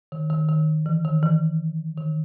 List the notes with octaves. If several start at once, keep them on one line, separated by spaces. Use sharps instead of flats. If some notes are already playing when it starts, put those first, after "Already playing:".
D#3
D#3
D#3
E3
D#3
E3
D#3